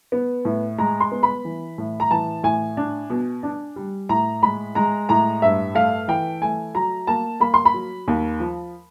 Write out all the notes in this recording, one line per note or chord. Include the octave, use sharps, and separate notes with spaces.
B3
A2
G#3 A#5
C6
B3
B5
E3
A2
A#5
E3 A5
A2 G#5
D4
B2
D4
G3
A2 A#5
G#3 B5
G#3 A#5
A2 A#5
G2 E5
A3 F5
E3 G5
A3 G#5
F#3 A#5
A#3 A5
A#3 B5
C6
B5
F#3
D#2
F3